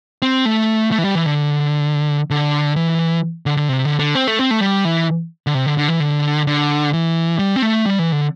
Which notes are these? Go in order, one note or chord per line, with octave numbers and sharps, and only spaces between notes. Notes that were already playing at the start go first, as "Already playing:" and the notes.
C4
A3
A3
E3
G3
E3
D3
D3
E3
D3
D3
C3
D3
D3
C4
A3
C4
A3
G3
E3
D3
C3
D3
D3
E3
D3
D3
E3
G3
C4
A3
G3
E3
D3